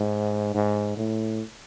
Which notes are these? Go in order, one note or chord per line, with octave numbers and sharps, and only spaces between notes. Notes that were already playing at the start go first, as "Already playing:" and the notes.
Already playing: G#2
G#2
A2